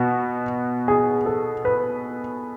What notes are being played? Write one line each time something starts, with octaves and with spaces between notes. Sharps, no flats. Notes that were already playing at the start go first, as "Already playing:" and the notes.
Already playing: B2 F#4
G#4
A4
B4